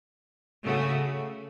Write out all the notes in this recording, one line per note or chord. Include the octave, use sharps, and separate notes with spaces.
C#3 A3 F#4